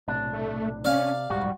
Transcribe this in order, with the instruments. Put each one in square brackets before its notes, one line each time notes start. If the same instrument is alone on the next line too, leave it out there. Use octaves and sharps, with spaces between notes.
[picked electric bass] B1 A2 C3 [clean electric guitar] D4
[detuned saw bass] A3
[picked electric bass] C3 [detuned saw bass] C#4 [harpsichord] D5 F5
[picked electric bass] D1 B1 G#2 [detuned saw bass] G3 [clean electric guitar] F#4